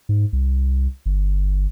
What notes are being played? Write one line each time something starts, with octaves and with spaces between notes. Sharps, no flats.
G#2
C2
G1